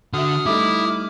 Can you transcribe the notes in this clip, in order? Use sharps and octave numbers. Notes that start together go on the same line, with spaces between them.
D3 F#4 A4 E5 D#6 F6
G3 A3 D#4 E4 D6